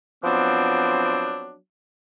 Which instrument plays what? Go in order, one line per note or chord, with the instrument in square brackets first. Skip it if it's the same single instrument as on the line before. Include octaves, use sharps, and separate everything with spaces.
[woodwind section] F3 F#3 B3 C4 D4